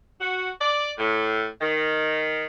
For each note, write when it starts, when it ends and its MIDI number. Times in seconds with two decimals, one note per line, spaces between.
0.21 0.50 66
0.61 0.91 74
0.98 1.46 45
1.61 2.44 51